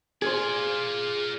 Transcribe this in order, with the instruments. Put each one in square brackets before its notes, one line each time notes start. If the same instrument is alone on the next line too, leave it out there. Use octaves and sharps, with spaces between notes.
[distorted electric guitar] F4 D5 [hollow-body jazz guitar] G#4 C5